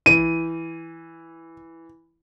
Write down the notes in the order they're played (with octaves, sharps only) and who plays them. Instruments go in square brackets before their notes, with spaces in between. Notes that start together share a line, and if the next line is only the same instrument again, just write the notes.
[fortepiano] E3 [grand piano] D#7